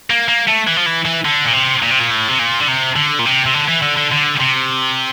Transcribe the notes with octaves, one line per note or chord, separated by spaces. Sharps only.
A#3
A#3
A3
E3
F3
E3
E3
D3
A#2
C3
A#2
C3
A#2
A2
C3
A#2
D3
C3
D3
A#2
C3
C3
D3
E3
D3
D3
D3
C3